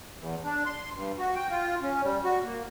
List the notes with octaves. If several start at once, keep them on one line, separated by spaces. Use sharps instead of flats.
E2
D4
C6
G2
F#4
G5
F4
C#4
G3
F#4
A#3